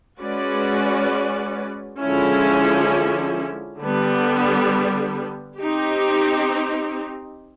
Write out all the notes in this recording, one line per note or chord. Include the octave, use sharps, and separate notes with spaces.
G#3 C#4 F#4 B4 D5
D3 F3 G#3 C#4 E4
D3 G3 B3
C4 D#4 G4